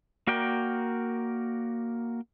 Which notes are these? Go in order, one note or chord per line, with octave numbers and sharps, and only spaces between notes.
A#3 F#4 A#4 D5 G5